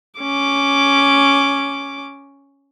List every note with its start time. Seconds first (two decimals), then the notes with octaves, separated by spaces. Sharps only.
0.20 C#4 D6